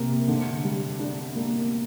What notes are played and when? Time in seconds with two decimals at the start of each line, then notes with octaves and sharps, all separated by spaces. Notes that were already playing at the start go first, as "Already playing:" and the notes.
Already playing: C3 A#3
0.28 D3
0.64 G3
0.99 D4
1.36 A#3